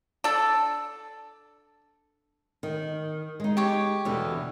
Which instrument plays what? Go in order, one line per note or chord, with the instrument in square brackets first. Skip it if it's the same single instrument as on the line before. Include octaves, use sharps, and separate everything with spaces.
[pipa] D4 A4
[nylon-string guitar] D#3
G#3 D#4
[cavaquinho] G4 C#5
[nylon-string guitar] E2 B2 D3